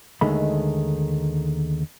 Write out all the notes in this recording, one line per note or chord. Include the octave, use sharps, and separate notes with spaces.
D#2 D3 D#3 G#3 A3 B5